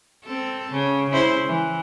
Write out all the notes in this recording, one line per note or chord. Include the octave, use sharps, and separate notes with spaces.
C4 A4
C#3
C#3 E4 C5
E3